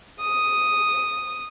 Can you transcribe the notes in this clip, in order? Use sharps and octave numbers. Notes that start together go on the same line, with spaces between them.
D#6